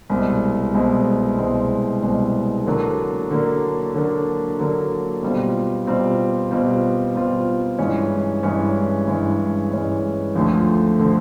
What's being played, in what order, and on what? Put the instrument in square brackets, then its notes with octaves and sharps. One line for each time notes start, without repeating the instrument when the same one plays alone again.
[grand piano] C2 B2 G#3 C4
C2 B2 G#3 C4
C2 B2 G#3 C4
C2 B2 G#3 C4
D3 F#3 A#3 D4
D3 F#3 A#3 D4
D3 F#3 A#3 D4
D3 F#3 A#3 D4
B2 G3 C4 F4
B2 G3 C4 F4
B2 G3 C4 F4
B2 G3 C4 F4
G2 E3 G#3 C#4
G2 E3 G#3 C#4
G2 E3 G#3 C#4
G2 E3 G#3 C#4
D2 D3 F3 A3 C4
D3 F3 A3 C4